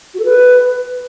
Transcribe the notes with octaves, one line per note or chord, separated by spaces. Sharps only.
F#4
A4
B4